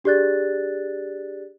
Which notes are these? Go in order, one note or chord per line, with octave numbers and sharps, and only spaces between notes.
D4 G4 G#4 D5 F#6 A6